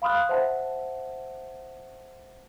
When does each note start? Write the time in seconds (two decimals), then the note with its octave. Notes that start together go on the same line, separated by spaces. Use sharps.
0.02 F5 B5 C6 D#6 F6 F#6
0.29 C5 E5 F#5 A5